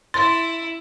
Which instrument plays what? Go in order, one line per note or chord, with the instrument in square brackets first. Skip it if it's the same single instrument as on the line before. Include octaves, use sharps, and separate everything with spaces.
[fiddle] E4 [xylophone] C6 [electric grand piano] A6